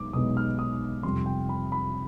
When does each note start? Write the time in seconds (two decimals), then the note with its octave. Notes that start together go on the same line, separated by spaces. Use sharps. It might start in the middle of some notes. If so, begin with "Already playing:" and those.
Already playing: B1 B2 G#3 B3 D#4 D6
0.13 B1 B2 G#3 B3 D#4 D#6
0.37 F6
0.59 D#6
1.03 F2 C3 G3 C6
1.26 G5
1.49 B5
1.72 B5